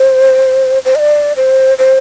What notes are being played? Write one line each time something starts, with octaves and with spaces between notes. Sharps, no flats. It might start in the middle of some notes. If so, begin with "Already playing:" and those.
Already playing: C5
C5
D#5
D5
C5
C5